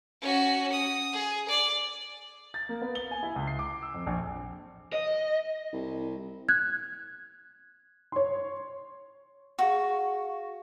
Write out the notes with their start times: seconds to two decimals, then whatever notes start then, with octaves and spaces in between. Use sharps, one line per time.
0.21 C#4 F#4
0.72 D#6
1.13 G#4
1.49 D5
2.54 A6
2.69 A#3
2.82 B3
2.95 G7
3.11 G#5
3.23 E4
3.36 C#2
3.47 C7
3.59 D6
3.82 E6
3.94 F2
4.07 A#1
4.93 D#5
5.73 C2
6.49 F#6 G#6
8.12 C#5 C6
9.59 F#4 G#4 F5 C#6